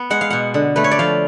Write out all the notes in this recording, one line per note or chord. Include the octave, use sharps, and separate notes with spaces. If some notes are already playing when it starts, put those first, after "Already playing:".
Already playing: B3
G#3 F#5
F5
B2 F#5
D3
A3 B4
C#5
D5
F3 F5